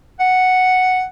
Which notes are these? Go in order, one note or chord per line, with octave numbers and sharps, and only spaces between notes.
F#5